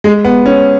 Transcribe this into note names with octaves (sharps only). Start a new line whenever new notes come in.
G#3
B3
C#4